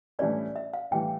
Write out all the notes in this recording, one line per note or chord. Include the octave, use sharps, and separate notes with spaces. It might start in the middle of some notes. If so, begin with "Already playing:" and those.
A2 E3 G3 C#4 E4 D5
E5
F5
A2 E3 G3 G5